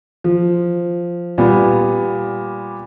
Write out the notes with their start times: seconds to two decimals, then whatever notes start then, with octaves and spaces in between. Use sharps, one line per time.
0.24 F3
1.38 A#2 G3 B3